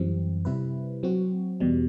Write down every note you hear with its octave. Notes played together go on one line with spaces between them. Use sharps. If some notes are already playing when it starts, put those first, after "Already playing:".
Already playing: F#2 E3 G3 C4
C3 G3 C4 E4 B4
F#3 C4 F#4
E2 B2 G3